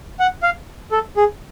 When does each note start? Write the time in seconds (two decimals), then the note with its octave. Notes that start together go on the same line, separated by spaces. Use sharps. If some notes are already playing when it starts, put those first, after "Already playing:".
0.20 F#5
0.43 F5
0.92 A4
1.17 G#4